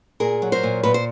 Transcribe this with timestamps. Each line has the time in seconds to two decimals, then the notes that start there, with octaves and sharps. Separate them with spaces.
0.20 A#2 G#4 A#4
0.42 F#3
0.52 A#4 C5
0.63 A#2
0.83 A#2 B4
0.94 C5